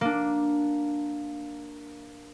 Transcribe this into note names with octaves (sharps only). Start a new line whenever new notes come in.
A#3 D4